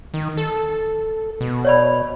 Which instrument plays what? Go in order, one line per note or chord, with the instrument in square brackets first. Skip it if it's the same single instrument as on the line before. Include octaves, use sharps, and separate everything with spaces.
[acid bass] D#3
A4
B2
[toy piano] C#5 D5 B5